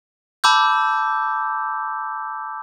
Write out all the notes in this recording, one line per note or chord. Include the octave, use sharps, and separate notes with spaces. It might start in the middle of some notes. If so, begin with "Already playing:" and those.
A5 B5 D6 E6 G6